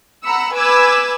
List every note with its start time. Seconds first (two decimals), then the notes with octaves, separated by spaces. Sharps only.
0.23 F#5 A#5 B5 E6 C#7
0.53 B4 G#5 D6 E6 G#6